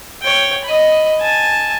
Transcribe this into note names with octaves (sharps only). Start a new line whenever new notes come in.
C#5 G5
D#5 B5
G#5 A5